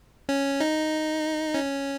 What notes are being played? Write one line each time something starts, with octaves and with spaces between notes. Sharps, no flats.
C#4
D#4
C#4